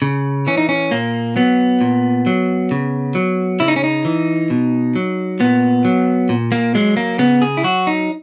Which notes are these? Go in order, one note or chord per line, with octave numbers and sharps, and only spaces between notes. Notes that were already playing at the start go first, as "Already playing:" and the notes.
C#3
E3 C#4
D#4
C#4
A#2 A#3
F#3 B3
A#2
F#3
C#3
F#3
C#3 E4
D#4
C#4
D#4
E3
B2
F#3
A#2 B3
F#3
A#2
A#3
F#3 G#3
A#3
C#3 B3
G#4
E4
F#3 F#4
D#4